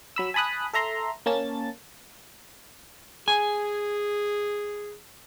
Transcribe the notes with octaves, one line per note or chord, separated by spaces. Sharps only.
F#3 B5 E6
G#5 A5 B5 D#6 F#6
A4 E5 A#5 C6
A#3 C#4 A5 A6
G#4 G#5